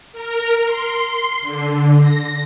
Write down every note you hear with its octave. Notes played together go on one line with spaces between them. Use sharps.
A#4
C6
D3
A#6